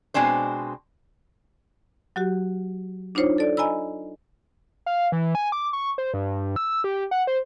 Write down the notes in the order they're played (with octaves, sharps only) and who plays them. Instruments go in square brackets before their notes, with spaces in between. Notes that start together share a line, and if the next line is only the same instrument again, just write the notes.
[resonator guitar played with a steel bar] B2 G#3 C4 D4 C5
[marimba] F#3 F#4 G4
D4 D#4 F4 C5 C#5
A4 D5
D#5 G#5 A#5 B5 E6
[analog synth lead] F5
E3
G#5
D6
C#6
C5
G2
E6
G4
F#5
C5